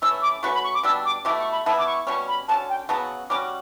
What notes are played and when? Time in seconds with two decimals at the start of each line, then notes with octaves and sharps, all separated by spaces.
0.02 E3 A3 C#4 E6
0.22 D6
0.42 A3 C#4 F#4 B4 C#6
0.54 B5
0.64 C#6
0.74 D6
0.83 B2 G3 D4 E6
1.05 D6
1.25 B2 A3 E4 G4 D6
1.39 C#6
1.52 B5
1.66 E3 B3 E4 A5
1.78 D6
1.86 C#6
2.07 B2 G3 C#4 C#6
2.28 B5
2.48 D3 F#3 C#4 A5
2.69 G5
2.89 C#3 F#3 B3 F#4 A5
3.30 G3 C#4 F#4 D6